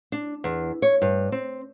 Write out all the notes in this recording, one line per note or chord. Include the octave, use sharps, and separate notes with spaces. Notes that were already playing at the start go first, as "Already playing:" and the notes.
D4
E2
C#5
G2
C4